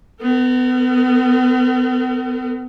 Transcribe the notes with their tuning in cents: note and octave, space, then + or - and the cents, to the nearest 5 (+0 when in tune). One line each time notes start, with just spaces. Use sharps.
B3 +35 A#4 -35